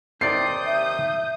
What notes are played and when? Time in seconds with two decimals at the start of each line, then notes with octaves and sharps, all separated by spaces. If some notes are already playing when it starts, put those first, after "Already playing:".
0.21 D#2 C3 D5 D#6 G6 C7
0.66 E5